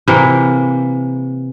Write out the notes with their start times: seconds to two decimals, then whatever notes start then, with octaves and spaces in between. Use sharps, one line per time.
0.08 C3 E3 A#3